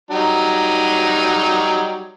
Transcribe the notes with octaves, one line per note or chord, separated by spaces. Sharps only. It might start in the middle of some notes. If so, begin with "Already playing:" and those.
F#3 G3 D#4